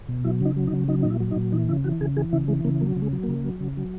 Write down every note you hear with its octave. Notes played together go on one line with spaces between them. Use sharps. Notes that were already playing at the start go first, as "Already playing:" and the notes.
B2
F#3 E4
C#3 D#4
F#3
D#4
C#3
F#3 D#4
A#2 D#4
E4
F#3
D#4
A#2
E3 D#4
C#3 E4
E3 F#4
C#3 G#4
E3 G#4
C#3 E4
E3 G#3
C#3 A#3
F#3 A#3
C#3
G#3
F#3
A#3
C#3
F#3
C#3
F#3